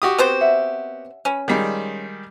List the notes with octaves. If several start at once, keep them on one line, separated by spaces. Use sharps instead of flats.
F#4 G4 D#6
B3 C4 C5
C#4 E5 F#5
C#4 B4
D#3 G3 G#3 F4 D5